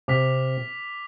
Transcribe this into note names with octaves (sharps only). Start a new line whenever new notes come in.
C3 D6 F6 B6 F7